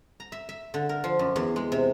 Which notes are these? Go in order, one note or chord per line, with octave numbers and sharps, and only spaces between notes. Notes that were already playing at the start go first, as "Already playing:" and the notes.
A#5
E5
E5
D3
A#4
F3
F#2
E2
G#3
C3